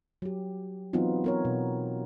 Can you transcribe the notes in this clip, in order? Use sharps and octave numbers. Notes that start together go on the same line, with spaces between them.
F#3 G4
E3 F#3 B3 C4 D#4 F4
B3 A#4 C#5
B2